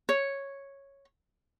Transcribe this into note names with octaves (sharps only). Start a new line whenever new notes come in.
C#5